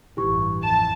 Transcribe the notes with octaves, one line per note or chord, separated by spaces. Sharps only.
A1 G2 E3 G4 C#6
F2 A5 E7